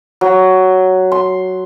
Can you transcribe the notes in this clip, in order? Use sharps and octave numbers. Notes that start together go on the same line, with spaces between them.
F#3
C6